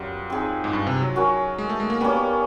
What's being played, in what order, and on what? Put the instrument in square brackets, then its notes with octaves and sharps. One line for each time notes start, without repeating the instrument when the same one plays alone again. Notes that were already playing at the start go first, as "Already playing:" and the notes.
Already playing: [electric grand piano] F#2 [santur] G3 B3 F4
[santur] C4 D#4 G#4
[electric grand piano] G#2
G2
C3
F#3
[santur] C#4 F#4 A#4
[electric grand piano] G#3
A3
G#3
A#3
[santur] G3 A#3 C#4 [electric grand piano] B3